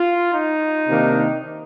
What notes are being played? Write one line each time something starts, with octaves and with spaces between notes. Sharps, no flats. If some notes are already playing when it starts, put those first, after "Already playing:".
Already playing: F4
D#4
C3 D#3 A#3 D4